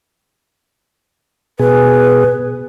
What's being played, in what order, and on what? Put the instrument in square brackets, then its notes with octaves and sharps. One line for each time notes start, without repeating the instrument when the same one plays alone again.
[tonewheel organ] B2 G#4 [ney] B4